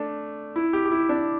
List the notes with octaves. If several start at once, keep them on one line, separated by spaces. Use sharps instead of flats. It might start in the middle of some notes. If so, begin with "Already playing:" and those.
Already playing: A3 D4
E4
G4
G4
E4
D4